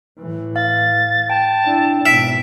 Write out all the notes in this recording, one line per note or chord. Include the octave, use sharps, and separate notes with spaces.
A2 E3
F5 A6
G5 A5
D4 E4
G#1 B2 E5 D7